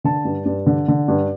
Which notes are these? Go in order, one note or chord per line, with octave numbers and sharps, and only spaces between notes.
D3 A5
G2
G2
D3
D3
G2